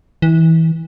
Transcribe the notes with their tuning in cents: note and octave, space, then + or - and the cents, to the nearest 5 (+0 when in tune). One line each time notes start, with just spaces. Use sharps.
E3 -25